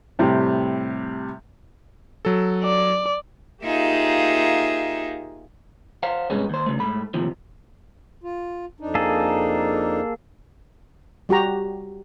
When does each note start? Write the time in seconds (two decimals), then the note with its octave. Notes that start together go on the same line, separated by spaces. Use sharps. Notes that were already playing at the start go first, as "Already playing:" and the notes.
0.19 A2 C3 G3
2.25 F#3 A4
2.64 D5
3.62 A#3 D#4 F4 G4 G#4 E5
6.03 C5 F5 F#5
6.30 G#2 C3 G3 G#3 B3 C#4
6.50 D#2 C5
6.66 C#3 A3
6.80 G#2 A3 B5
7.14 D#2 A2 C3 F3
8.24 F4
8.80 F2 D4 D#4
8.95 A#3 G#4 A4
11.29 G3 F#4 G4 A#5